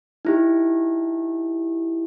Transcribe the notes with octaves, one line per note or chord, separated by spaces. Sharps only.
D#4 E4 G4